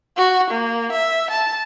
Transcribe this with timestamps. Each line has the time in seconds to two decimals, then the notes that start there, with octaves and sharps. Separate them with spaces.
0.17 F#4
0.50 A#3
0.92 E5
1.30 A5